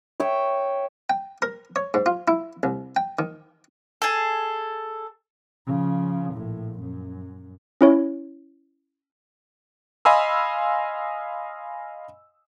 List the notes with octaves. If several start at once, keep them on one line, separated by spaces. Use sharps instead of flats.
C#5 E5 G5
G5
A#4
C#5
G#2
F4
E4
C2
G5
D#3
G#4 A4
C#3 F3
A#1 A2
F#2
C#4 E4 C#5
D#5 F5 G#5 B5 C6 E6